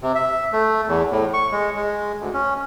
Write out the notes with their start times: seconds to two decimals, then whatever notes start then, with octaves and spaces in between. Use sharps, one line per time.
0.02 C3
0.15 E5
0.52 A3
0.88 E2
1.11 A2
1.33 C#6
1.51 G#3
1.76 G#3
2.20 D2
2.34 C#4